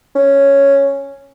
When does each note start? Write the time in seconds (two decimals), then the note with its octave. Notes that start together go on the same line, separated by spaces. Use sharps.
0.16 C#4